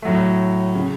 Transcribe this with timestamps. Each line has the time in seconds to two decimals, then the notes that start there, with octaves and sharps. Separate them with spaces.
0.02 A2 F#3 A3
0.75 C#3